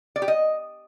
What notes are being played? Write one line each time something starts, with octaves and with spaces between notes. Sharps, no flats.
D5
G4
D#5